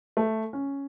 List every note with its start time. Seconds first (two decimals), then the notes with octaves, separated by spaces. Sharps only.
0.17 A3
0.53 C#4